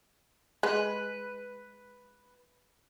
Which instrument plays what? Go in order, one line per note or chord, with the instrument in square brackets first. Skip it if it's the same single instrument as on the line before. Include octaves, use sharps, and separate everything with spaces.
[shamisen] G#3 [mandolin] B4